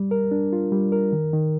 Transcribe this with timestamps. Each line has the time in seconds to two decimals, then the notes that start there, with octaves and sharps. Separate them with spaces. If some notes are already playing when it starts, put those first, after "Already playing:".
Already playing: G3
0.11 A#4
0.31 D4
0.53 F4
0.72 G3
0.92 A#4
1.13 D#3
1.33 D#3